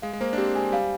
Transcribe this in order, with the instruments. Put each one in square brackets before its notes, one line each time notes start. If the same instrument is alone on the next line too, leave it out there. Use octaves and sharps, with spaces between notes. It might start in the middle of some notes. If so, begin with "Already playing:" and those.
[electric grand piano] G#3 [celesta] F5
[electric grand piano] G#3
[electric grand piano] A#3 [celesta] C5
[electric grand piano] D4
[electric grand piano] C4 [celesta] G4
[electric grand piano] G#3 [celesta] G#5
[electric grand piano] G3 [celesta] F5